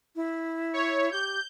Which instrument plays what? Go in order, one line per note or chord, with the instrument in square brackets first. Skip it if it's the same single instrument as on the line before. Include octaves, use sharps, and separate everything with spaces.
[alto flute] E4
[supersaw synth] C#5
[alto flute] G4 [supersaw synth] G6